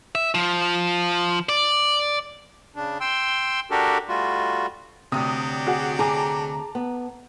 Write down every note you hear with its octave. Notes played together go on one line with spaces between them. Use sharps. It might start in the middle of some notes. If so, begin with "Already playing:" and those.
E5
F3
D5
C#3 D4
G5 C6 E6
D4 F#4 G4 A4 A#4
G3 A3 F4 F#4
D2 C3 F#3 G4 D5 D#6
F#4 G#4 F#5
G#4 A5 A#5 D6
B3